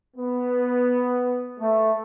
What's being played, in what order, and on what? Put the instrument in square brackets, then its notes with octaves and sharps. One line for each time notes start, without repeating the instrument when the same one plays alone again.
[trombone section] B3
A3